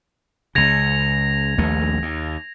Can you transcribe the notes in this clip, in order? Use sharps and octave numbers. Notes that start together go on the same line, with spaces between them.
C#2 C#3 G#6 A#6 F7
A#1 D#2 A3
D#2